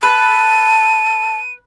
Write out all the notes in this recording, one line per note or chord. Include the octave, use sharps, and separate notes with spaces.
B4 A5 D#7